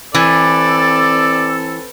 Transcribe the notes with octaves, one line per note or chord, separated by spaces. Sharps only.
E3 C4 A4 D5